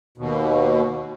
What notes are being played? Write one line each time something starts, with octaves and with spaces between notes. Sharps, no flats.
D#2 B2